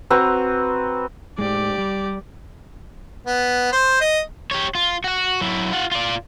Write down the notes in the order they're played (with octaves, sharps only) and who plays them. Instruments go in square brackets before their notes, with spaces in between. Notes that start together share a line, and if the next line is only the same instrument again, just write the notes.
[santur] C4 F#4 B4 A#5
[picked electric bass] A2 G#3 [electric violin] G4 D5
[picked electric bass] G3
[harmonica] B3
C5
D#5
[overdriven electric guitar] G4 C#5
F4
F#4 F#5
F#3 E4
F4 F#5
F4 D5